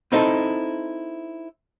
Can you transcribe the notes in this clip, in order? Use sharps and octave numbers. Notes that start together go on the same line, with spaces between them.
C4 D#4 E4 A4